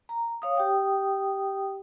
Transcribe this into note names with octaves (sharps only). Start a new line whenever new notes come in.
A#5
C#5 F5 D#6
G4 G5 D#6